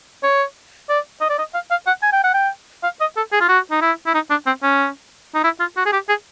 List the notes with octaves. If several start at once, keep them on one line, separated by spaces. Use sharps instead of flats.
C#5
D5
D#5
D5
D#5
F5
F5
F#5
G#5
G5
F#5
G5
F5
D#5
A4
G#4
F4
F#4
D#4
E4
E4
D#4
D4
C4
C#4
D#4
E4
F4
F#4
G#4
G4
G#4